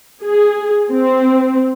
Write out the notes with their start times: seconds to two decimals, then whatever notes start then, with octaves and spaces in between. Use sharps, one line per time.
0.22 G#4
0.90 C4